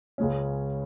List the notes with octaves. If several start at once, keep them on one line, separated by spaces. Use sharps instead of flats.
C#2 C#3 G#3 C#4